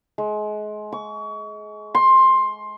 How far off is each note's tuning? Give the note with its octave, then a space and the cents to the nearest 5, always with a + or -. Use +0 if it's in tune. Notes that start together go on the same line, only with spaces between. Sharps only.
G#3 +30
C#6 +30
C6 +15